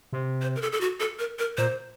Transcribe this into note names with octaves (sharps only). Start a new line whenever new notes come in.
C3
C5
A#4
A4
A4
F#4
A4
A#4
A#4
A#2 C5